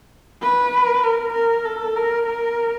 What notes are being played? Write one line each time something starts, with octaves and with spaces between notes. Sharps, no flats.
B4
A#4
A#4
A4
A#4
A#4